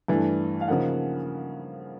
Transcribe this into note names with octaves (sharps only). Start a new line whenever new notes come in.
G2 E3 A3 D4
F5
C#3 F3 A#3 D#4 F#5